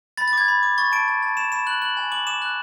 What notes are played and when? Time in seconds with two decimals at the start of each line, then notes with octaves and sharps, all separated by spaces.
0.17 B5 A6
0.28 A6
0.33 D6 G#6
0.48 B5
0.63 D6
0.78 C#6 A6
0.92 A5 D7
1.08 A5
1.23 A5
1.37 B5 E7
1.52 B5 E7
1.67 F#6 F#7
1.82 F#6 F#7
1.97 G#5
2.12 D6 F#7
2.27 D6 E7
2.42 F#6